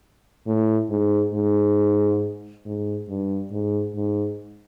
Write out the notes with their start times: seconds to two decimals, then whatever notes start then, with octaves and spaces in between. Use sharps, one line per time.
0.47 A2
0.90 G#2
1.34 G#2
2.65 G#2
3.09 G2
3.52 G#2
3.96 G#2